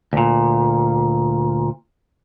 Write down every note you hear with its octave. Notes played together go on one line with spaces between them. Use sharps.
D2 A#2